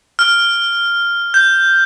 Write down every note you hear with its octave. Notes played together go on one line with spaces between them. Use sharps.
F6
G6